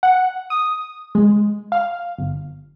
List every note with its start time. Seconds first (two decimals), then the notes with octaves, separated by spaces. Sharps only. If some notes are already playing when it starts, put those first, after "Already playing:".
0.03 F#5
0.50 D#6
1.15 G#3
1.72 F5
2.18 G1